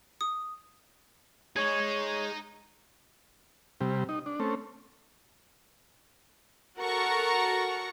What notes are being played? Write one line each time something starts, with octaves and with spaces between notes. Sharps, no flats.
D#6
D#4 G#4 C#5 D#5 G#6
C3 G3
D#4
D4
A3 C4 C#4
F#4 A4 A#4 F#5 A#5 C#6